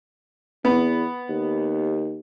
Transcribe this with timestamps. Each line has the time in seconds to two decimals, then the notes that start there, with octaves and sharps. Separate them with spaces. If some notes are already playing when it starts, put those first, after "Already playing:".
0.65 E2 B3
1.29 D#2